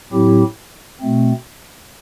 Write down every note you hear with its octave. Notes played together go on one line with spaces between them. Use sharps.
A2 F#3 C4 E4 G4
B2 A3 C4